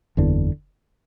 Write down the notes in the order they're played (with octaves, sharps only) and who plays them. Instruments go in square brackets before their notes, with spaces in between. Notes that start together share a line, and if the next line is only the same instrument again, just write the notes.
[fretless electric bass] F#1 E2 D3